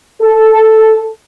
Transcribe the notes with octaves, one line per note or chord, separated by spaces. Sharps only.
A4